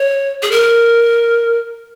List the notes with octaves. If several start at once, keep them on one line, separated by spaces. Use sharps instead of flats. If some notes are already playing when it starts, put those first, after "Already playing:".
Already playing: C#5
G#4
A#4